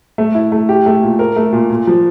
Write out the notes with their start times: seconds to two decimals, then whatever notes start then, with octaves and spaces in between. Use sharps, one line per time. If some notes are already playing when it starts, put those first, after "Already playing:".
0.18 A3
0.35 E4
0.52 A3
0.69 G4
0.86 A3
1.03 A#2
1.19 A#4
1.36 A3
1.53 A#2
1.70 A#2
1.87 F3